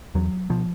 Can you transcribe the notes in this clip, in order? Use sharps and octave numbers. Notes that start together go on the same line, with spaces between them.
E2 F#3
B2 F3